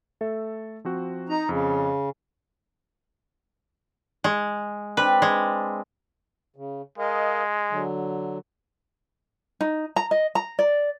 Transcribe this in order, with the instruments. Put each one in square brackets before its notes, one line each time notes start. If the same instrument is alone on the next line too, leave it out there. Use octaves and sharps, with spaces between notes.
[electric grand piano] A3 A4 E5
F3 C4 F#4
[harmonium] D#4 A#5
[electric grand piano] F2 [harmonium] C#3
[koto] G#3
[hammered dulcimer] C4 D4 [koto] B4
[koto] G#3
[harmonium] C#3
[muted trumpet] G#3 [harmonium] A#4 D#5 F5
[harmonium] D3 F#3
[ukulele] D#4
A#5
D#5
A#5
D5